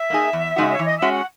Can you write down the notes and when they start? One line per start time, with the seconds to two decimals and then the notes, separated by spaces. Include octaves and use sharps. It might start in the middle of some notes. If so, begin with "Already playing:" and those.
Already playing: E5
0.10 A#3 D#4 G#4
0.33 E2
0.56 C#3 G#3 D#4 F#4
0.71 C#5
0.79 E3
0.85 D#5
0.98 G#3 C#4 F#4 E5
1.12 F#5